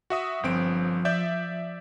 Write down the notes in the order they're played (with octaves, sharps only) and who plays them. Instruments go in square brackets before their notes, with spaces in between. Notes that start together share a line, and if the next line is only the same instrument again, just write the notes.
[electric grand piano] F#4 E5 D#6
[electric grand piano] G1 C4 D7 [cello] F3
[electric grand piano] D5 E5 G6